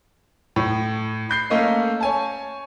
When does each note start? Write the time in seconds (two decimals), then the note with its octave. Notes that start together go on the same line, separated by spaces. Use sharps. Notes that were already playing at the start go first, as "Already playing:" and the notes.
0.56 A2
1.29 B5 G6 C7
1.50 A3 A#3 C#4 A#4 D#5 F5
2.00 C#5 G#5 A5